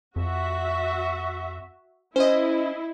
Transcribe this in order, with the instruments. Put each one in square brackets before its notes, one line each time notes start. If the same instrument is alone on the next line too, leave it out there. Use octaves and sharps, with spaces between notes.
[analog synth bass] F2 [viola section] F#4 E5
[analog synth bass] C#4 [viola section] E4 [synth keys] C5 D#5